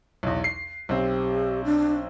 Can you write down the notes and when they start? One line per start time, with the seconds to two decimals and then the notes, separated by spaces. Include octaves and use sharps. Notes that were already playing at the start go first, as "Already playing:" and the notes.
0.23 B1 E2
0.44 C7
0.89 B1 C4 G4
1.65 D4